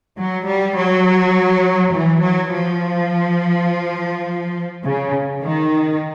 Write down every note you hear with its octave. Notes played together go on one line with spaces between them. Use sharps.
F#3
G3
F#3
E3
F#3
F3
C#3
D#3